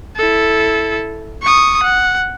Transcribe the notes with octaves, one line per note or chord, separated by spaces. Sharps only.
E4 A4
C#6 D#6
F#5